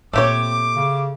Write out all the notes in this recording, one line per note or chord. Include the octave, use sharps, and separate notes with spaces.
A#2 A3 C4 G4 C#5 D6
C#3